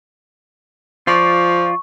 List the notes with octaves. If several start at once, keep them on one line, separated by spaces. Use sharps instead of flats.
F3 F4 D5 C#6